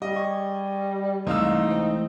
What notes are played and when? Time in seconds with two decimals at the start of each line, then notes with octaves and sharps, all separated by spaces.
0.02 G3 G4 D#5
0.16 G#4 C#6
1.27 C2 E3 G#3 A3 D#4 F5 E6
1.70 C4